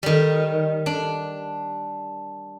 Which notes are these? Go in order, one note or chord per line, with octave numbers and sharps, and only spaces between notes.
D#3 G3
D4